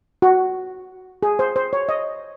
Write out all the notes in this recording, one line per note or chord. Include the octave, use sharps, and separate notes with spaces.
F#4
G#4
C5
C5
C#5
D#5